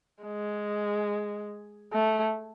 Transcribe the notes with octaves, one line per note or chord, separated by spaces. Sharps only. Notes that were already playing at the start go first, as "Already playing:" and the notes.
G#3
A3